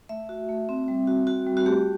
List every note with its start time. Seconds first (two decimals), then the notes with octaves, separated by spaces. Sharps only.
0.09 A3 E5
0.29 F#4
0.49 A3
0.69 C4
0.88 G3
1.07 F#4
1.27 F#4
1.47 G3
1.57 F#4
1.66 A3 G4